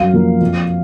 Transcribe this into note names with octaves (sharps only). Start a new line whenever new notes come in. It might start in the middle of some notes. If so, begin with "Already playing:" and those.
Already playing: F#2 F5
F3 A#3
F2